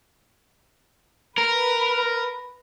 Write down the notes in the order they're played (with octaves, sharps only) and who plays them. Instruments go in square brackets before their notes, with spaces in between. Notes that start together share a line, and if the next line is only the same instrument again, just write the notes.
[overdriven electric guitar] A#4 [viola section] B4